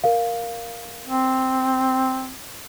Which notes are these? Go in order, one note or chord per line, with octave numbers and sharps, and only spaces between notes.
A#4 F5
C4